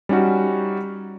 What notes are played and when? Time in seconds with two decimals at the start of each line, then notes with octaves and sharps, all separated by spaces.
0.09 G3 C#4 D#4 F#4